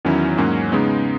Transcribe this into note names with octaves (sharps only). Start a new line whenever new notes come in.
E2 D#3 F#3 C#4 E4
G#2 F#3 A#3 C#4 F#4
C#3 G#3 B3 D#4